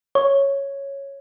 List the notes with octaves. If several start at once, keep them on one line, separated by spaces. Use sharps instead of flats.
C#5